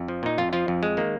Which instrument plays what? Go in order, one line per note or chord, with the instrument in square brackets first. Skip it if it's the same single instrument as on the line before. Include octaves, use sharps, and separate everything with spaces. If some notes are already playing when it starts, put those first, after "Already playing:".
Already playing: [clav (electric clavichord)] F2
F3
A#2 D#4
F2 F4
F3 F4
F2
G#3
D#3 A#3